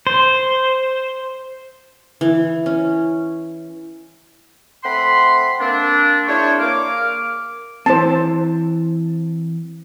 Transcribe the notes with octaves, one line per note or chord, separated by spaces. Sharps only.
C5
E3
C#4
A3 C4 F#5 B5 C6
A#3 C4 D4
D4 E4 G#4 C5 C#5
A#3 D6 F6
E3 C4 C5 A5